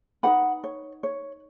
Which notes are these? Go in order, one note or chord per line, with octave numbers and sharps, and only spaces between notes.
D#4 F#4 B4 F#5 B5
C#5
C#5